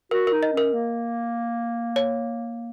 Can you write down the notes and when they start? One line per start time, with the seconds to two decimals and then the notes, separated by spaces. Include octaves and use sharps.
0.11 F#4 A#4
0.27 A#4
0.32 D#4
0.43 D#5
0.53 C#4 A#4
0.73 A#3
1.96 C#5